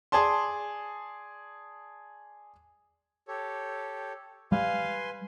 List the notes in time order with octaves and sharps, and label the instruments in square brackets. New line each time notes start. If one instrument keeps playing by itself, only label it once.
[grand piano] G#4 D5 A5 C6
[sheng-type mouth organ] G4 A4 C#5
[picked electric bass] G3 [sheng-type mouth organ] B4 G#5 C6 [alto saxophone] F5